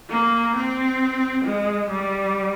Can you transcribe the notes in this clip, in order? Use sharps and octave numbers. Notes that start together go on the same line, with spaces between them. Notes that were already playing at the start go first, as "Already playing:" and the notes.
A#3
C4
G#3
G3